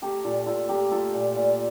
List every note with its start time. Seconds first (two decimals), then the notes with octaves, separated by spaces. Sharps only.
0.02 A3 G4 A#4
0.24 A#2 F4 A4
0.46 A#2 F4 A4
0.69 A3 G4 A#4
0.91 A3 F4 A4
1.14 A#2
1.36 A#2